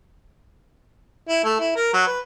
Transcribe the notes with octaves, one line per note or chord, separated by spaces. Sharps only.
E4
A3
E4
A#4
F#3
B4